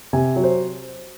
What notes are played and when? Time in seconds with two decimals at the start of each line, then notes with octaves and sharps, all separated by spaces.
0.13 C3 G#5
0.36 F#3
0.44 C5